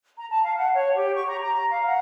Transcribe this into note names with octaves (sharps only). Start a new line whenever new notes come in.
A#5
A5
F5
F#5
C#5
G4
C#6
A#5
A#5
F5
F#5